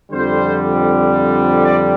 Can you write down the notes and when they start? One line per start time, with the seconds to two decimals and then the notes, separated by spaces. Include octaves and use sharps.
0.12 F2 D3 G3 C5
1.64 D5